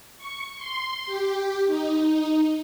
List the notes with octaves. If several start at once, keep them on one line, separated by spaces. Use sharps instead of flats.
C#6
C6
G4
D#4